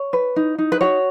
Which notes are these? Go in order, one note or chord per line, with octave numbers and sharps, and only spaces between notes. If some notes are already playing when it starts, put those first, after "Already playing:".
Already playing: C#5
B4
D#4
D#4
B4
F#4 C#5